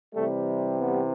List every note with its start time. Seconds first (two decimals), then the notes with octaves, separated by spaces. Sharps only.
0.14 C3 E3 G3 A3
0.80 G3 B3